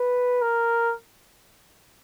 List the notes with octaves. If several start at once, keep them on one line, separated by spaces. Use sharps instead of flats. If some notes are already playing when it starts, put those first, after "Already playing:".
Already playing: B4
A#4